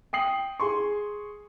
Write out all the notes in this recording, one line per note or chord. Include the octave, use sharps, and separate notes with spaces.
G5 D#6 C7 F#7
G#4 C6 C#6